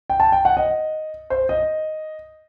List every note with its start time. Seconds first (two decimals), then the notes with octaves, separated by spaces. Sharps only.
0.10 G5
0.20 A5
0.32 G5
0.45 F#5
0.57 D#5
1.30 C5
1.49 D#5